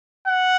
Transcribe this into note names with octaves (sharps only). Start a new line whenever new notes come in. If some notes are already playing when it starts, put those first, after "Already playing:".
F#5